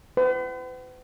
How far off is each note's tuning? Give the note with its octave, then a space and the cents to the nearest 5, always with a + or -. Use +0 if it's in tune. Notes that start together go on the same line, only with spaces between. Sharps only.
B4 +45